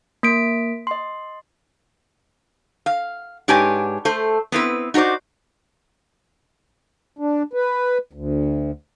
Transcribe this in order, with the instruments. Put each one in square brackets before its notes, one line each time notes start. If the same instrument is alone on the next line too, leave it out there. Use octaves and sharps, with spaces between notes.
[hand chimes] A#3 B6 D7
D#5 C6
[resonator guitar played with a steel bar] F5
G#2 D4 G4 B4 C#5 G#5
A3 C5
B3 C4 E4 B4
D#4 F#4 G#4 C5 D5
[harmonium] D4
B4
D2